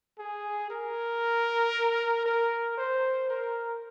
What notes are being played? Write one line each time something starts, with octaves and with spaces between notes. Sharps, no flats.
G#4
A#4
A#4
C5
A#4